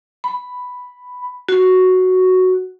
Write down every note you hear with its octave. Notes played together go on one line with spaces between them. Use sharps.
B5
F#4